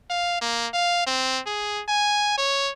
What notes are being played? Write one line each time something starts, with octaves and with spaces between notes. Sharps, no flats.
F5
A#3
F5
C4
G#4
G#5
C#5